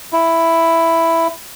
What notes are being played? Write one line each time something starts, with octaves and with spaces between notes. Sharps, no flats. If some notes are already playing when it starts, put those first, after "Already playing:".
E4